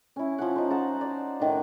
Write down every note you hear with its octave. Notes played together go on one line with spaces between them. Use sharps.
C#4 E4
F3 C#4 F#5
D#4 C5
F#5 A5 A#5
D5
A2 D#3 D4